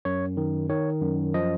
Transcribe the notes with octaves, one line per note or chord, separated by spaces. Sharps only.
F#2 C#5
D#3
D#3 C#5
F#2
F3 D#5